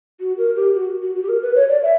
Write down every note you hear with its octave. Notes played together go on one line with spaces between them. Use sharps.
F#4
A#4
G4
F#4
F#4
F#4
G4
A#4
B4
C#5
D5
E5